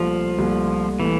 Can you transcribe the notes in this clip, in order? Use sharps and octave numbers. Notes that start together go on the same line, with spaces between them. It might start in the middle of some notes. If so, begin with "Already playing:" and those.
Already playing: C2 A#2 F3 A3
C2 A#2 A3
A#2 E3 A3